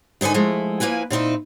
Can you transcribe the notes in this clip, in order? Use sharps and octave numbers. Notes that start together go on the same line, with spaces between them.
G#2 D3 D#4 B4 G#5
F3 G#3 A3 E4
F3 A#3 E4 B4 G#5
A#2 C4 D#4 E4